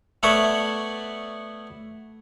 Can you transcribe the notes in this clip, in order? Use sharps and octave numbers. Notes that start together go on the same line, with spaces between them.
A3 B3 C#5 D5 E5 F#5